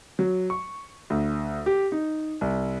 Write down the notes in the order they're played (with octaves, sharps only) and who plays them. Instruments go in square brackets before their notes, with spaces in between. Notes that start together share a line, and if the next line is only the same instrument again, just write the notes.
[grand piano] F#3
C#6
D2
G4
D#4
C2